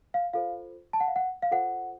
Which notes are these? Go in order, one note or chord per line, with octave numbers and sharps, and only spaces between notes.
F5
F4 A4 C5 F5
A5
F#5
F5
F#5
F5
F4 A4 C5 F#5